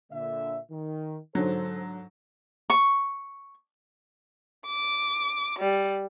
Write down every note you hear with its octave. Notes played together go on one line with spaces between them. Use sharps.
A#2 D3 E5
D#3
G#2 D3 F#3 A4 C5
C#6
D6
G3